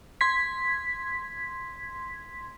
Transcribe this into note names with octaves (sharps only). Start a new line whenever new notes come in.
C6 G#6 B6